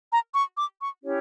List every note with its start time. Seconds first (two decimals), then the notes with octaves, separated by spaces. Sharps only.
0.11 A#5
0.34 C#6
0.57 D6
0.80 C#6
1.03 C#4 E4 G4 C#5